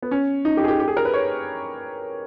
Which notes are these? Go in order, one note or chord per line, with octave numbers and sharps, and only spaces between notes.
B3
C#4
D#4
G4
G#4
G4
G4
G#4
A#4
B4
C#5